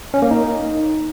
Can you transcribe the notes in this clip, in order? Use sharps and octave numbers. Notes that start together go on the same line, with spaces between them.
C#4
A#3
D#4